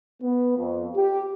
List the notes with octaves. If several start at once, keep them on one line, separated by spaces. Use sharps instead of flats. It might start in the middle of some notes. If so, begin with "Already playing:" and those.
B3
F2
G4